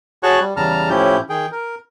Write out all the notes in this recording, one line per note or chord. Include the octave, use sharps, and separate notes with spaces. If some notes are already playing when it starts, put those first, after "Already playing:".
F#4 G#4 C#5 A5 C#6 F#6
G3
E2 C#3 G3 A5 A#5 F6
A2 F3 C#4 E4 G4 G6
D#3 G#4 G5
A#4